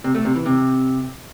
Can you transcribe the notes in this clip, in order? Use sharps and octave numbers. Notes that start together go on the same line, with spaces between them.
C3
A3
C3
E3
C3